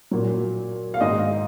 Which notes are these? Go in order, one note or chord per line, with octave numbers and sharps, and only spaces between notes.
A#2 F#3
F5
G#2 D#3 G#3 D#5